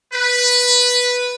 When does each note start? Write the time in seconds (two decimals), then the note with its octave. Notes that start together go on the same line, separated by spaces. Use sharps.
0.13 B4